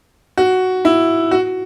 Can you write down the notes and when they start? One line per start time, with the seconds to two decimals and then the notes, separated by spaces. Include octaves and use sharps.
0.37 F#4
0.85 E4
1.31 F#4